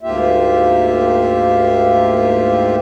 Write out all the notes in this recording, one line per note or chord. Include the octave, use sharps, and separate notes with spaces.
D2 G#2 A#3 F4 G4 E5